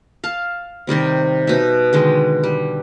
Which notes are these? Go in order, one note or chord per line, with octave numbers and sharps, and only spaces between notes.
F5 A5
C3 D#3 G3 C4
B2 D#4 E5
D3 D#3 G#3
G3